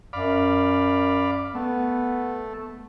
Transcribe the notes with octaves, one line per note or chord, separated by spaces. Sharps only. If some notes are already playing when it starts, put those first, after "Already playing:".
F#2 D5 F5 B5
A3 B3